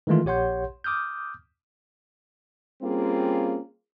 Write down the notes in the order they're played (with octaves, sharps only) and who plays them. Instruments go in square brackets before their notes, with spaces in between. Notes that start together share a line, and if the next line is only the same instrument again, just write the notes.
[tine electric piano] D#3 E3 G#3 A3 F4
A#1 G4 C#5 F#5 C6 G6
D6 D#6 F6 G6
[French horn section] G3 A#3 C4 C#4 F4 G#4